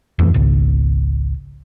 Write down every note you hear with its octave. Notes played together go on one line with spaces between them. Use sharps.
D#1 F2 E3 A3
G#1 C#2